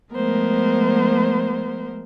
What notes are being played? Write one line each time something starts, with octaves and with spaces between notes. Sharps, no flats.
F3 G#3 A3 B3 A#4 C5